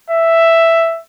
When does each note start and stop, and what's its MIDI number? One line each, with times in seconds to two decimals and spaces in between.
0.10 1.00 76